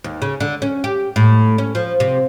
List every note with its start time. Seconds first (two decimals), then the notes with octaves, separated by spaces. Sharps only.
0.04 D#2
0.22 C#3
0.40 D3
0.62 C#4
0.84 G4
1.16 A2
1.58 C#4
1.75 F3
2.00 C3